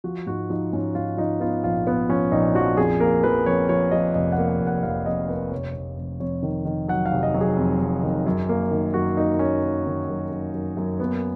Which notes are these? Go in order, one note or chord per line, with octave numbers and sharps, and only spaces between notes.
F3 F#4
G#2 F#4
F3 D#4
G#2 C#4
G#2 F4
F3 D#4
B3 F4
A#1 F4
B3
F3 C#4
A#1 D#4
F3 F#4
F2 G#4
A#3 A#4
F3 B4
F2 C#5
F3 C#5
F3 D#5
F1 D#5
F#5
A#3
F#5
F1
F#5
F1 F5
F2 D#5
A#3 B4
F1 C#5
F1
F1
F2 C#5
D#3
D#3
F#3 F#5
F5
F1
D#5
F#3
G#4
F2
F2
D#3
F#2
A#3
D#3
F#2 F#4
A#3 D#4
A#3 C#4
A#3
D#3
F#2
F#2
F#2
F#2
A#3 B3